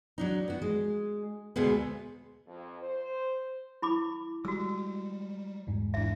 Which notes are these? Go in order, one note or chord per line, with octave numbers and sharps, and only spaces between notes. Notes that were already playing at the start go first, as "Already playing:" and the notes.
F#3 D4 D#4
B3 F#4
G#3
D2 B2 G#3 A3 B3
F2
C5
E4 B5 D6
G3 G#3 F#4 E6
E2 G#2
G#1 E3 D4 E5